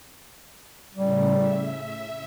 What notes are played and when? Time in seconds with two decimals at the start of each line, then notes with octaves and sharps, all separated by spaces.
0.95 A2 C#3 G3
1.36 E5